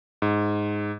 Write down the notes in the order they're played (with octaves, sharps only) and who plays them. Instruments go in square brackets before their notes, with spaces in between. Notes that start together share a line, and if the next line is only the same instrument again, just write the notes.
[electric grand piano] G#2